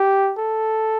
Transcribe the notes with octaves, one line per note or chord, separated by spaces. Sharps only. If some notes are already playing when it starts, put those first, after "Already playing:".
Already playing: G4
A4